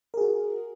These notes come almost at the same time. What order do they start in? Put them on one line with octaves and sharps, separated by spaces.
A#4 G#4 F#4